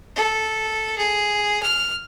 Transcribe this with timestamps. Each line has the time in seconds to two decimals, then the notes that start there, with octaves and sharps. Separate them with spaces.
0.16 A4
0.98 G#4
1.63 F6